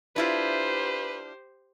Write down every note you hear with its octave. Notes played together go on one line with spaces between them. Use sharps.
D4 E4 F4 G4 B4 C5